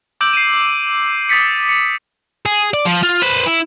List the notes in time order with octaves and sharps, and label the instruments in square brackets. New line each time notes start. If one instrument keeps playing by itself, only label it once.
[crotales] D6 E6 G6 D7 F#7
C7 D#7
D6 D#6 A6 B6 C#7
C#7
[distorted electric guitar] G#4
D5
F3
F4
B4 C5
E4